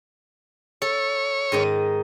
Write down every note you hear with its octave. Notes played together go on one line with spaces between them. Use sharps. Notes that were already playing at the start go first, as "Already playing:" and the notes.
A4 C#5
G#2 D#3 D#4